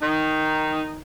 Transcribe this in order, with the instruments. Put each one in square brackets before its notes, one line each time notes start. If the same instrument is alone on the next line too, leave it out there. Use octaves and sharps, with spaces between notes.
[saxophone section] D#3 D#4